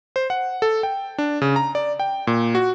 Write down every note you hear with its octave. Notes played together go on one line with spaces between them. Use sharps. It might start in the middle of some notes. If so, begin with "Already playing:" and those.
C5
F#5
A4
G5
D4
C#3
A#5
D5
G5
A#2
F#4